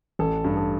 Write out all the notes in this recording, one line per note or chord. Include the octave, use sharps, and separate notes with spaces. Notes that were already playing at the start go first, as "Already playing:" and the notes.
A1 A4
G2
A4